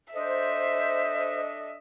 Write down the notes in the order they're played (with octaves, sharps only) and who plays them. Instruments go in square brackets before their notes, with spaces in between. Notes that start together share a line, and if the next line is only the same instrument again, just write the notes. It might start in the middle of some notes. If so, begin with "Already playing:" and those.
[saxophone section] D4 A4 D#5 [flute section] C5 [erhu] E5